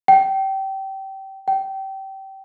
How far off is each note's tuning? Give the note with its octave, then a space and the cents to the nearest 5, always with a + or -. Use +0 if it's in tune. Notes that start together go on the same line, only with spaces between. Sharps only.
G5 -25
G5 -25